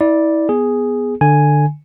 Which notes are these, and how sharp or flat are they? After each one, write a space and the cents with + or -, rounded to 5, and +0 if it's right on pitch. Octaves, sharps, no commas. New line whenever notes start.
E4 -30 D5 +0
B3 +0 G#4 +0
D3 +15 G#5 +0